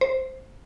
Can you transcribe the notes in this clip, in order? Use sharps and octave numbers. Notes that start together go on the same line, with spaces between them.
C5